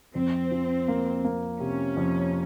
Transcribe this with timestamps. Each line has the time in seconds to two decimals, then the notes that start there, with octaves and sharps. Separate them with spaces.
0.15 F2 C4
0.51 F3
0.88 A#3
1.25 A#3
1.60 C3 C#4
1.97 F2